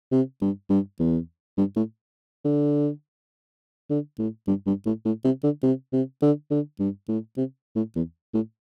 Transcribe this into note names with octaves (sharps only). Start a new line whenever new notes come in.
C3
G2
G2
E2
G2
A2
D3
D3
A2
G2
G2
A2
A2
C3
D3
C3
C3
D3
D3
G2
A2
C3
A2
E2
A2